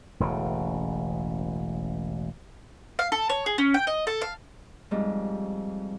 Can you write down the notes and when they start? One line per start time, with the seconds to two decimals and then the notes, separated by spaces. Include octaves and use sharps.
0.20 E1 A1 C#3
2.99 F5
3.12 A4
3.29 C#5
3.46 G#4
3.58 C#4
3.74 G5
3.87 D#5
4.07 A4
4.21 F5
4.91 F2 G#2 G3